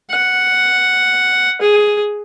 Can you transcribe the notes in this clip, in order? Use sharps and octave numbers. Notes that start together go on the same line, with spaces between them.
F#5
G#4